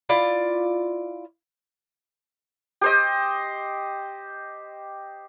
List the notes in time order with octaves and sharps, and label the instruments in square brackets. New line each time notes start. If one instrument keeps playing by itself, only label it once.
[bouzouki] E4 F4 D5
[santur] G4 C5 D#5